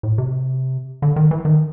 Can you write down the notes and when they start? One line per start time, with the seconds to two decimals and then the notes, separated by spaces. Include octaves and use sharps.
0.03 A2
0.18 C3
1.02 D3
1.16 D#3
1.31 E3
1.45 D#3